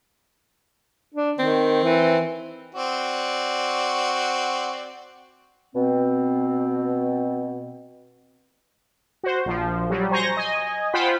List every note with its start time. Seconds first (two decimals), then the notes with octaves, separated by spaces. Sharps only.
1.14 D4
1.39 D#3 C4
1.84 E3
2.75 C4 F#4 D5
5.74 B2 C4
9.23 F#4 C5
9.46 A#1 F3
9.90 F#3 G3
10.11 C5 G#5 A#5 C#6 G6 A#6
10.37 D#5 G#5
10.93 F4 C5 F#5 G5 B5 B6